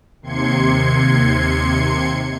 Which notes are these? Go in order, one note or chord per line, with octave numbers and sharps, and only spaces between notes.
D#2 C3 C6 G#6 C#7